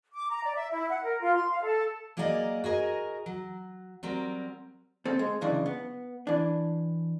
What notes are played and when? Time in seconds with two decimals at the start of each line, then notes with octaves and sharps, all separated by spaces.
0.14 D6
0.31 A#5
0.44 D5
0.57 E5
0.72 E4
0.89 F#5
1.03 A#4
1.21 F4
1.35 C6
1.50 F5
1.63 A4
2.17 F#3 A#3 G#4 A#4 D5 D#5
2.64 F#4 G#4 A#4 D#5
3.26 F#3
4.03 F#3 G3 C4 A#4
5.06 C4 A4
5.19 G#3
5.41 C#2 F#2 C#3 E3 D4
5.66 B3
6.27 E3 D4